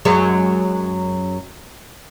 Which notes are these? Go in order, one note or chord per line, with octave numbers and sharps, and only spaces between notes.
F#2 F#3 G#3